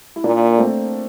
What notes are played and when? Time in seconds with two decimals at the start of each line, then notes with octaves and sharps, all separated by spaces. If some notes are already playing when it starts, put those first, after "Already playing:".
0.16 E4
0.24 A#2 A#3 D4
0.58 A3 C4